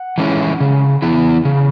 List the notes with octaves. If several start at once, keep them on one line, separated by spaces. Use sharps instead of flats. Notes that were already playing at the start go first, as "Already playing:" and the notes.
Already playing: F#5
E3 G#3 C#4 E4
C#3
E3 B3 E4
C#3